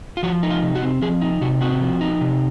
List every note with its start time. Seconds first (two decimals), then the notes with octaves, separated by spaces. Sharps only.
0.17 F4
0.23 F3 F#4
0.43 D#4
0.50 F4
0.62 C3
0.75 F#4
0.82 C4
1.02 F3 G#4
1.22 D#4
1.41 C3 F#4
1.61 C4 F#4
1.81 F3
2.01 D#4
2.21 C3